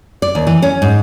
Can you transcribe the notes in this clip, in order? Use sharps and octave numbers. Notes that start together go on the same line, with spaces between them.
D5
D#2
E3
C#4
G#2